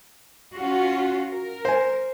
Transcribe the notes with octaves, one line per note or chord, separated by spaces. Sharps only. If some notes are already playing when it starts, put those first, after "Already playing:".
C#4 F4 F#4
A#4
C5 G#5